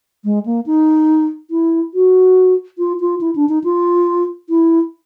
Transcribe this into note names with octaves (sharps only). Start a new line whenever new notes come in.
G#3
A#3
D#4
E4
F#4
F4
F4
E4
D4
D#4
F4
E4